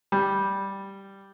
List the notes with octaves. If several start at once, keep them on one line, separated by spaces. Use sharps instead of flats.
G3